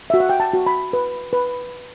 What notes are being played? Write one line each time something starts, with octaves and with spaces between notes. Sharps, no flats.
F#4 E5
F#5
G5
A5
F#4
B5
B4
B4